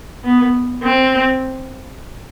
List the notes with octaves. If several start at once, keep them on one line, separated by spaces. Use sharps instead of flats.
B3
C4